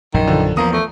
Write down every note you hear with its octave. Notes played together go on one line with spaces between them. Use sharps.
A#1 F#2 D#3
D3 F3
E2 F3 A#3 A#5 D#6
A3